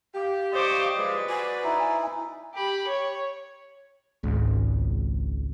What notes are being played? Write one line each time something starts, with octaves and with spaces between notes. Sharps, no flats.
G4 F5
C5 D5 D#5 C#6 D6
F3 F#3 G#3 B4
F#4 C5 D5 G#5
D#4 E4
G4 B5
C#5
G#1 C#2